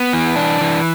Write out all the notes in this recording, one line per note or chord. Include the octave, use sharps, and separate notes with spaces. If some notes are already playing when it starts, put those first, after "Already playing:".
Already playing: B3
E3
D4
E3